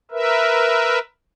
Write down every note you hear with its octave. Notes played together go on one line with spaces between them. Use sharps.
A#4 B4 E5